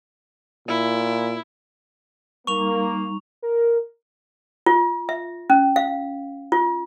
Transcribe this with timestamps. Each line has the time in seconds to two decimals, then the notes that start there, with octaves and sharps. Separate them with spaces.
0.68 A#2 E4
2.47 G3 A#3 D#4 A#5 C#6 F7
3.42 A#4
4.66 F4
5.09 E5
5.50 C#4
5.76 F5
6.52 F4